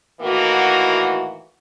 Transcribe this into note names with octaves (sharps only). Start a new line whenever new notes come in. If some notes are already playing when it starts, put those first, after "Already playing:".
A2 D#3 E3 A#3 F#4